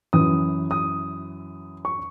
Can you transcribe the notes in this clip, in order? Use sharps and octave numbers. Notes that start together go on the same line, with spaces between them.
F#2 E3 D#6
D#6
C#6